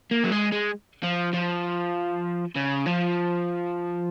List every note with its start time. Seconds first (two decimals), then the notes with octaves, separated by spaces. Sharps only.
0.11 A#3
0.24 F#3
0.32 G#3
0.52 G#3
1.03 F3
1.33 F3
2.56 C#3
2.86 F3